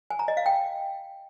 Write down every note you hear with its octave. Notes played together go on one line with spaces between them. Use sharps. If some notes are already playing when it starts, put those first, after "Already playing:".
G#5
A#5
D#5
F5
G5